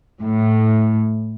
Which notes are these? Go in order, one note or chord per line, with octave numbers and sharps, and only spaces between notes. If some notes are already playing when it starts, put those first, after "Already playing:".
A2